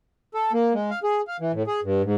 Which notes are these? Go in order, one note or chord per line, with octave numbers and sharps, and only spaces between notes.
A4
A#3
G#3
F5
G#4
F5
E3
A2
G#4
G2
G#2